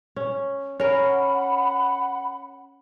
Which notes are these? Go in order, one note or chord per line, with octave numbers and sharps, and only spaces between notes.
C#4
C#4 A#4 F#5 B5